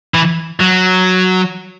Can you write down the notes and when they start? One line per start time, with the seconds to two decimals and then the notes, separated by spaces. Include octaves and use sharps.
0.14 E3
0.60 F#3